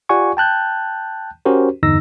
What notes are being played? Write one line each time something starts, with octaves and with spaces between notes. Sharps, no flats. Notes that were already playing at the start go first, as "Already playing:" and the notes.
F4 G4 D5 F#5 G#5 C#6
G5 A5 F#6 G6
C#4 F#4 G4 A#4 C5
E2 G2 D3 D#4 E6 A#6